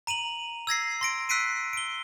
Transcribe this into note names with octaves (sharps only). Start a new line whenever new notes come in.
A#5 D#7 F7 F#7
E6 G#6 A#6 C7
C6 A#6 D7
E6 F#6 B6 C7 D7 D#7
D7 G7